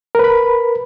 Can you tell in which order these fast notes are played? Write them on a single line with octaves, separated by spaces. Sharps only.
A#4 B4 B5